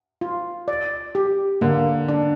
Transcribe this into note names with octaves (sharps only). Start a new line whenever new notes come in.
F4
D5
G4
D3 A#3
D4